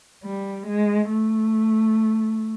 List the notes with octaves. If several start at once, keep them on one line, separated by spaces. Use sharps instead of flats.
G3
G#3
A3